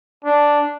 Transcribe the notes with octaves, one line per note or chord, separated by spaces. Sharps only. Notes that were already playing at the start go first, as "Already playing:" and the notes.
D4